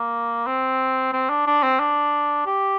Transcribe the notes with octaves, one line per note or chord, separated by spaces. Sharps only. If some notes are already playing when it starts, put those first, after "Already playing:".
Already playing: A#3
C4
C4
D4
D4
C4
D4
G4